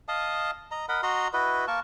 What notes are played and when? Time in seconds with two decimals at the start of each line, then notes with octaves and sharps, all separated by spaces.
0.08 D#5 F5 A5 D#6
0.71 D#5 A#5
0.89 A#4 D#5 F#5 B5
1.03 F#4 D#5 A#5 C6
1.33 E4 F#4 B4 D#5
1.68 A#3 A#4 A5 C#6